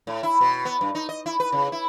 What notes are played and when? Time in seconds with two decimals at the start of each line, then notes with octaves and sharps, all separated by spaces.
0.07 A2
0.23 E4
0.41 B2
0.65 B3
0.81 G2
0.95 D#4
1.09 D#5
1.26 E4
1.40 B4
1.52 C#3
1.72 E4